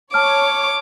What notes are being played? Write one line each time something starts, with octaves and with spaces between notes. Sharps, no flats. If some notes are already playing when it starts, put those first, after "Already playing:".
C#5 A5 D6 F6